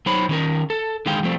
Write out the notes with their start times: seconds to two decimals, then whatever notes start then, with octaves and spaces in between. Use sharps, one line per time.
0.06 F#3 D#4 C5 C#5 B5
0.29 D#3 C#4 A#4
0.70 A4
1.06 D3 D#3 G#3 F5 G5
1.23 F3 G3 A3 C4